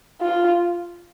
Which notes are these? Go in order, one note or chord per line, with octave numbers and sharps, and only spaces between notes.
F4